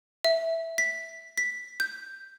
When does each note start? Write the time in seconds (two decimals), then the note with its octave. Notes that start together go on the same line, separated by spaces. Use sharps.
0.25 E5
0.78 B6
1.38 B6
1.80 G6